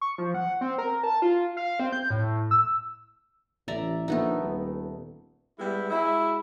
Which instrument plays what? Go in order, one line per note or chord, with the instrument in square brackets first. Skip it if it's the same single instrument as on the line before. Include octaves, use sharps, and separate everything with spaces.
[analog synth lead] C#6
F3
F#5
C4
A#4
A5
F4
F5
C4
G6
A2
E6
[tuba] A1 [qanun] D5 E5 A#5
[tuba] A#1 [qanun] A3 B3 D#4
[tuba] D#1
[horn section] G3 G#3 B3 E4
G#3 E4 F#4 E5